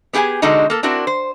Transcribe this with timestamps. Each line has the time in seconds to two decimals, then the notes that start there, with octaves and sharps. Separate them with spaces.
0.13 B3 G4 G#4 F#5 G#5
0.42 B2 D3 G#3 D4 D#4 F#4
0.70 A#3 A4
0.83 C4 D4 E4 F#4 A#4
1.07 C5